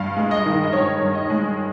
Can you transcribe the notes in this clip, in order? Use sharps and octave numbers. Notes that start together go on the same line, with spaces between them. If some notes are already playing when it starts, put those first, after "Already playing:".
Already playing: G2 F5
G#3
D#5
D#3
D#5
G2 C#5
G2
D#5
G#3